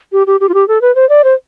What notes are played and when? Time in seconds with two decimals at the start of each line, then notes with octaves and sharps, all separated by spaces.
0.12 G4
0.27 G4
0.40 G4
0.49 F4
0.54 G4
0.68 A4
0.81 B4
0.95 C5
1.09 D5
1.24 C5